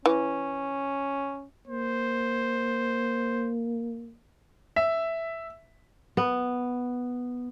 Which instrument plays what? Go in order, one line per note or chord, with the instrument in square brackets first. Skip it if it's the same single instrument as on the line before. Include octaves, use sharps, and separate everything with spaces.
[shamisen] E3 [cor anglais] C#4
[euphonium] A#3 [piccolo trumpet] C5
[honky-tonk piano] E5
[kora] B3